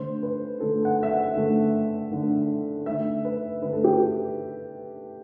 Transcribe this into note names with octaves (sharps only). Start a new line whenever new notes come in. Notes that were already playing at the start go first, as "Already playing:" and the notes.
Already playing: D3 A3 C5
B4
D3 A3 A4
F#5
E5
F#5
D3 A3
D3 A3
D3 A3 E5
B4
D3 A3 B4
A4
G4